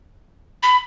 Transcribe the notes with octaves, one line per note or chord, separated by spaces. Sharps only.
B5